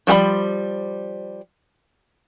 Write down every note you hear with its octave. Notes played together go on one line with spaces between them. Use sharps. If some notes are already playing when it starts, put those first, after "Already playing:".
F3 G3 D4 C5 B5